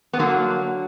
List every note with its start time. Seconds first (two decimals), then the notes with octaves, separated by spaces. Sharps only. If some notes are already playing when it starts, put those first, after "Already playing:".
0.13 B3
0.19 D3 F#3 A#3